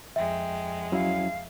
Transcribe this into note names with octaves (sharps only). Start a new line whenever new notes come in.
F2 G#3 E5 G5
F#3 C#4 E4 F5